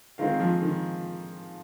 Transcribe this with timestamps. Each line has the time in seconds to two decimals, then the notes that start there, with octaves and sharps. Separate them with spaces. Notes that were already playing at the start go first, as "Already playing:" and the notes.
0.18 D#3 G#3 C4 F4 A#4 F5
0.40 F3
0.62 D#3